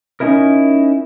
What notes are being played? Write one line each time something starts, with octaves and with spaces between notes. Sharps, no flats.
C#4 D#4 E4 A#4